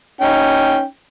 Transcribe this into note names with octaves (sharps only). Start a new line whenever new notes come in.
C#4 D#4 G5